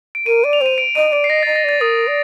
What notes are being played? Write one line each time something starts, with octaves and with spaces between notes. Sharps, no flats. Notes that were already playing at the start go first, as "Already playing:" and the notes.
D7
A#4 D#7
D5
F7
C5 D#7
D7
D#5 D#7
D5 D7
C7
D#5 A#6
D#5 A6
A#6
D5 A6
A#4 D#6
D5